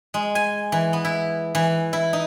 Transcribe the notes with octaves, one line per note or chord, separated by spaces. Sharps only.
G#3
G#5
E3
B3
E4
E3
E4
D#4